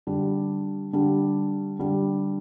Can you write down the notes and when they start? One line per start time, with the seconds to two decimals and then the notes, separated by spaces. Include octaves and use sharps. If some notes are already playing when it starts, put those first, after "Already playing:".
0.07 D3 G3 D4
0.93 D3 G3 D4
1.79 D3 G3 D4